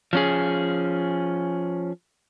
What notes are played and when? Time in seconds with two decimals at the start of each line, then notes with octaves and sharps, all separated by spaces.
0.13 F3 C#4 G#4